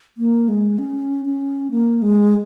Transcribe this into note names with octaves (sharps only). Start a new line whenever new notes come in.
A#3
G#3
C#4
C#4
A#3
G#3